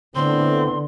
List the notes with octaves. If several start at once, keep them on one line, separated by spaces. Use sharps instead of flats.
A2 D3 B3 C4 C6